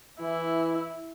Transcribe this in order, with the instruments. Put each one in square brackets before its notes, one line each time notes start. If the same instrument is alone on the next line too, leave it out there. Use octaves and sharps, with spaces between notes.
[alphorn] E3 [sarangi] E4